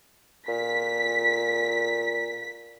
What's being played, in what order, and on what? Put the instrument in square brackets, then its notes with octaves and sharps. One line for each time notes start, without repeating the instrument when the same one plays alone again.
[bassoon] A#2 [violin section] B6